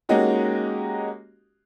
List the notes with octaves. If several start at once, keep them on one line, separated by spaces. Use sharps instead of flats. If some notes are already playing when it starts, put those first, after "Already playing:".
G#3 A#3 C#4 D#4 F#4 G4